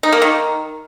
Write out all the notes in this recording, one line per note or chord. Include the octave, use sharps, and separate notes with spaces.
D#4
A#3
D#3